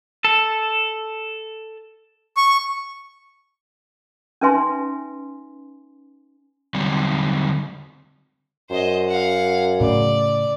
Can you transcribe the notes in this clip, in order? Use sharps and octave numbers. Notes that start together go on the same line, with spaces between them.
A4
C#6
C#4 D#4 B4 E5 G#5 C6
D3 F#3 G3 C4
F#2 C5 D#5
F5 F#5
A2 C#3 D5